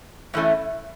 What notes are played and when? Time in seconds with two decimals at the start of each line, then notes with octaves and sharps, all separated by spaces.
0.34 A2 E3 A3 C#4 E4